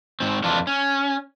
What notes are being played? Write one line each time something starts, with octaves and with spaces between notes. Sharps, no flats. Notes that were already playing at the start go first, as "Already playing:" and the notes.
G#2 C4
F2 E3 D4 F4
C#4